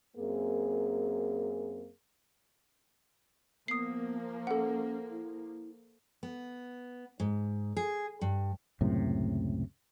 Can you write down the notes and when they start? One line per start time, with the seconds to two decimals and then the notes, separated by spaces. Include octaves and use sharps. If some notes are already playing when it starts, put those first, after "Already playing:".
0.16 F#2 A#3 C4 G#4
3.68 F3 A#3 B3 D#6 C7
4.47 C#4 A4 F#5
5.10 E4
6.23 B3
7.20 G#2
7.77 G#4
8.21 G2
8.81 C#2 F#2 A2 C3